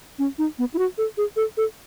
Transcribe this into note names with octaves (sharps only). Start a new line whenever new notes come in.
C#4
D#4
B3
E4
F#4
A4
G#4
A4
A4